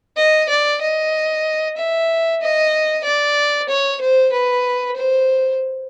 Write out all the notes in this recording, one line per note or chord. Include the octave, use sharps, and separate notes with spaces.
D#5
D5
D#5
E5
D#5
D5
C#5
C5
B4
C5